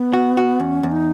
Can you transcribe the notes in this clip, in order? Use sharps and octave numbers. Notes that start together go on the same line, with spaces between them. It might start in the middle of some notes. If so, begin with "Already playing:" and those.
Already playing: B3
F#4
F#4
E2 C#4
E2
D#4